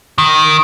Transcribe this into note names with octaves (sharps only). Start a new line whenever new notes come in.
D#3